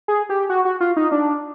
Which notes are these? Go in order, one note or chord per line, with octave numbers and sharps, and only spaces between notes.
G#4
G4
F#4
F#4
F4
D#4
D4